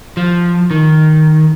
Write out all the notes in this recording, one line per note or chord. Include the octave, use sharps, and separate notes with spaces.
F3
D#3